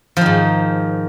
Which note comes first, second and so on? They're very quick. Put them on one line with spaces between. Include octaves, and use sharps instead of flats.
F3 D#3 G#2